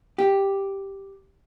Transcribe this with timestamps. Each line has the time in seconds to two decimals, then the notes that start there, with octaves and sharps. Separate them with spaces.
0.18 G4